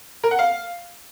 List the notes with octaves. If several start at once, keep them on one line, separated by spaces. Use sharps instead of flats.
A#4
F#5
F5